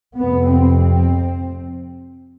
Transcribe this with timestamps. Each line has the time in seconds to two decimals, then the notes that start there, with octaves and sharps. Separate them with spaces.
0.18 F2 C3 B3
0.48 C4